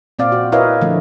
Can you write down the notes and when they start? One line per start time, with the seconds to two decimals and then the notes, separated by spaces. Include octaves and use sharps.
0.19 A#2 C4 D5 F5
0.32 F#4
0.52 E4 A#4 B4 C#5 D#5 F5
0.81 D3 F3 A3